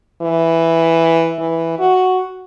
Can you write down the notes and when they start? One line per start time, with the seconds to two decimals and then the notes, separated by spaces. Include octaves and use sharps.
0.22 E3
1.39 E3
1.79 F#4